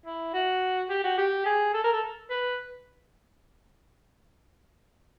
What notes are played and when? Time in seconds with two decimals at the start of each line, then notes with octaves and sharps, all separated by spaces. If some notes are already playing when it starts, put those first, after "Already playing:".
0.05 E4
0.34 F#4
0.90 G4
1.04 F#4
1.18 G4
1.45 G#4
1.74 A4
1.84 A#4
1.93 A4
2.30 B4